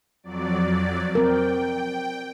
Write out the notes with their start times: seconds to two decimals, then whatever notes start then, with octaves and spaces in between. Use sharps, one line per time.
0.23 F2 F#3 D5
1.15 C4 A#4 G5